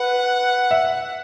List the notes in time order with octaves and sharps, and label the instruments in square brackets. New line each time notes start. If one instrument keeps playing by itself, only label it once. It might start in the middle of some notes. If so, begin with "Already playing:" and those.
Already playing: [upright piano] B4 [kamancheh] F#5
[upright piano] E5